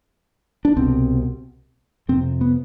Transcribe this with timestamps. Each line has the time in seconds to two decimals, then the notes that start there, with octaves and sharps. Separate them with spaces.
0.65 D4
0.76 C2 B2 C4
2.09 F2 C3 C4
2.41 B3